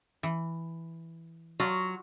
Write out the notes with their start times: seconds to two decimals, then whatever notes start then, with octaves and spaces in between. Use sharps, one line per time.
0.23 E3
1.60 F#3 F4